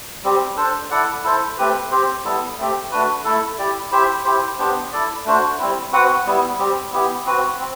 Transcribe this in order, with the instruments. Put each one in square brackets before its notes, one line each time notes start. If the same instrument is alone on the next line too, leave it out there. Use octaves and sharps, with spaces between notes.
[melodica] G3 C4 G4
D4 A4 C5
E4 A4 D5 F#5
E4 A4 C5
A3 C4 G4 B4
C4 G4 C5
G3 B3 E4 A4
A3 C4 G4
A3 D4 F#4 B4
A3 E4 A4
E4 G4 D5
E4 G4 C5 E5
E4 G4 C5
B3 D4 G4 C5
E4 A4 D5
A3 D4 F#4 C5
G3 C4 E4
C4 F#4 B4 F#5
G3 B3 E4
G3 C4 G4
B3 E4 G4
C4 F#4 B4
C4